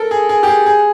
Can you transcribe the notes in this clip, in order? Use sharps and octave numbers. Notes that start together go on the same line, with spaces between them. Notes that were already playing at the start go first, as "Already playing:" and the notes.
Already playing: A4 A#4
G#4
G#4
G4
G#4
G#4